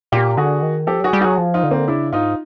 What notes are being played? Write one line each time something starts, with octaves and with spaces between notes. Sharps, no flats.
A#2 F4 G4
D3 F#4 G#4
D#3
F3 G4 A4
F#3 F#4 G#4
G3
F#3 F#4 G#4
F3
D#4 F4
D3
A#3 C4
C#3 D4 E4
G#2 D#4 F4